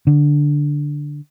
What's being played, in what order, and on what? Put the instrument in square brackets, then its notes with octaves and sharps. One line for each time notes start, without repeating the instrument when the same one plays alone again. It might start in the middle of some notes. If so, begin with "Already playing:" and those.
[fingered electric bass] D3